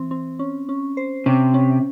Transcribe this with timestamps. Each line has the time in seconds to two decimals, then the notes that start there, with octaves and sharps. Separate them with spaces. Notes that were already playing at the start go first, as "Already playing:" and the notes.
Already playing: E3 C4
0.11 C4
0.39 C#4
0.69 C#4
0.97 C5
1.26 C3 C#4
1.54 C#4